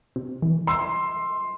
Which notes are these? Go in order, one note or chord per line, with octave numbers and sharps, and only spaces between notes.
C3
E3
C6 E6